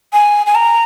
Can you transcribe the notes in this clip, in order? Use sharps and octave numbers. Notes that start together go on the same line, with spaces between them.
G#5
G#5
A#5